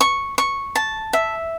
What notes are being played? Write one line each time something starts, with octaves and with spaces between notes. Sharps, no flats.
C#6
C#6
A5
E5